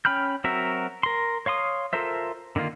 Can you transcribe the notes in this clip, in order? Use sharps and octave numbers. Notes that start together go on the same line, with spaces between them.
C#4 G5 B5 F6 G6
F#3 C4 F#4 A#4 E5
A#4 C6
C#5 F5 C6 D#6
F4 A4 A#4 C5 E5
D3 D#3 A#3 F4